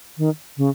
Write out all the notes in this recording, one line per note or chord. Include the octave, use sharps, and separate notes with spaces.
D#3
C#3